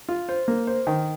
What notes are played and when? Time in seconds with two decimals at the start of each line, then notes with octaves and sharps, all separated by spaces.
0.09 F4
0.29 C5
0.48 A#3
0.67 C5
0.87 D#3